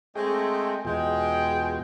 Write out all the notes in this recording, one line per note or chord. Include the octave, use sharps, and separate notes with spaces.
G#3 A3 C4 G#4 D#5 G5
E2 B2 G#3 F4 G5